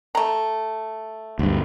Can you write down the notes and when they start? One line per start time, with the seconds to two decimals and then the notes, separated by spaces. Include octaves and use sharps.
0.15 A3 A#5
1.39 D2 G2